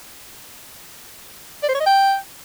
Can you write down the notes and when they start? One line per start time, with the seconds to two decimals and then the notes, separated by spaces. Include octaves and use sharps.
1.63 D5
1.69 C5
1.74 C#5
1.80 D#5
1.86 G5